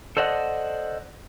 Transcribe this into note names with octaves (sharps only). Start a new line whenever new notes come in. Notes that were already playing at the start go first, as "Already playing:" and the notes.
A4 C5 D5 D#5 F#5